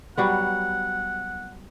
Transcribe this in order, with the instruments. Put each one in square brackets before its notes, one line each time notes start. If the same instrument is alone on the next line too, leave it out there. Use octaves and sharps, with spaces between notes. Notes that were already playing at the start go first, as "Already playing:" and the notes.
[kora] F#3 G3 B3 [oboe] F#5